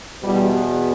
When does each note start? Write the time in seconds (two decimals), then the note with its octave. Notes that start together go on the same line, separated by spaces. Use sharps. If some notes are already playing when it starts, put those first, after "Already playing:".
0.23 E2 B2 G3